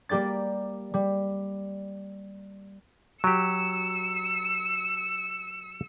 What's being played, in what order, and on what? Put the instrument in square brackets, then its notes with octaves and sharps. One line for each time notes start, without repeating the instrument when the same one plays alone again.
[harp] G3 A#3 G4 D5 A6
G3
[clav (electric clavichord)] F#3 G4 [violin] E6 C#7